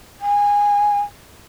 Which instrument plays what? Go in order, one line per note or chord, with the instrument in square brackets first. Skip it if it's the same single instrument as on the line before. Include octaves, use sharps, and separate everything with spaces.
[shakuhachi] G#5